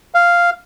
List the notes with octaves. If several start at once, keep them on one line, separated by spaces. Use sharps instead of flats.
F5